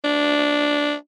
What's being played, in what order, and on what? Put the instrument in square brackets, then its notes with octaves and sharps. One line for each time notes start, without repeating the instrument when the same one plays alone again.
[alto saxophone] D4